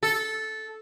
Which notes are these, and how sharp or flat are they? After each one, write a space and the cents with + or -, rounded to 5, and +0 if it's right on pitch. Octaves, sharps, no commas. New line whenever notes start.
A4 -10